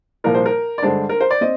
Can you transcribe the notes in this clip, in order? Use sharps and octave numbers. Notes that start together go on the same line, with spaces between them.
C2 A#2 F3 A#4
C5
A#4
D5
G2 D3 G#3 D4 C5
A#4
C5
D5
C4 D#5